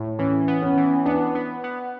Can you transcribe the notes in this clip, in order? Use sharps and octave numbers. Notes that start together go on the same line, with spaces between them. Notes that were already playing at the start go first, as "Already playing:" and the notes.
Already playing: A2
E3 C#4
B3
C#4
E3
B3 D4
B3
B3